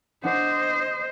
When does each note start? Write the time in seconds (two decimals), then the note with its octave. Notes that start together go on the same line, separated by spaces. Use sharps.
0.24 D4 C5 D#5 F#5